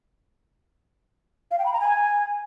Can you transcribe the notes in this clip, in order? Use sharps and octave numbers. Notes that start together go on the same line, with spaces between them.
F5
G5
B5
A#5
G#5